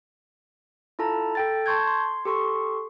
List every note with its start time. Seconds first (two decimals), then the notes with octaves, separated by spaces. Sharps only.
0.99 E4 F4 A4 A5 A#5
1.35 A4 G5 A6
1.66 A5 C6 C#6 G6 G#6
1.87 C6
2.25 G4 A4 C6 C#6